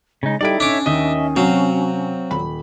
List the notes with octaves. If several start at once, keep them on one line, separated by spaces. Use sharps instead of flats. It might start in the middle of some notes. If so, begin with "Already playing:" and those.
C#3 G#3 D#4
G3 D#4 E4 A4 D5 D7
C#4 D4 C#5 E5 D6
D#2 D#3 D#5 E5 D#6
C3 F#3 C4 F#4 F5
D#1 B5